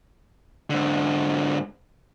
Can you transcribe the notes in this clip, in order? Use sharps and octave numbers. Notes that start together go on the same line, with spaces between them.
G#2 D3